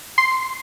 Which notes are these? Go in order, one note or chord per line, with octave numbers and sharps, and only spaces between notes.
C6